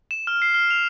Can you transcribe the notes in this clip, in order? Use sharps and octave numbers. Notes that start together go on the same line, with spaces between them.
E7
F6
C7
F6
F7